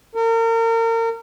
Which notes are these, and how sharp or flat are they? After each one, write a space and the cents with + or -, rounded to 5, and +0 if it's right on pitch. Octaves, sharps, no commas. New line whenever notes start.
A#4 -35